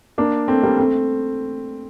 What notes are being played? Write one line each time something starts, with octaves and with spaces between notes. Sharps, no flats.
A#3 D4
A3 C4
G3 A#3
A3 C4